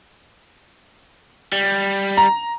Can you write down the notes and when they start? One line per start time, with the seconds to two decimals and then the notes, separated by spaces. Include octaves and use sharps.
1.53 G3
2.17 A#5